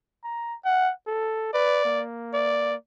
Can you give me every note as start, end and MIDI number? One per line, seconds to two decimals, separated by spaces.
0.24 0.55 82
0.65 0.92 78
1.07 1.52 69
1.54 1.83 71
1.54 2.03 74
1.85 2.76 58
2.34 2.74 74